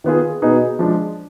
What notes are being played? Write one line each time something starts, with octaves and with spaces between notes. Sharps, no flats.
D#3 B3 F4 G#4
B2 B3 D#4 G#4
F3 G#3 D4